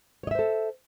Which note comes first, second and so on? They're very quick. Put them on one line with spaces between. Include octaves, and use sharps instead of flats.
C#5 D#5 E5 C5 A4